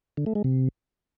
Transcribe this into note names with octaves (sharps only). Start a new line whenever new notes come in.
D3
A3
G#3
C3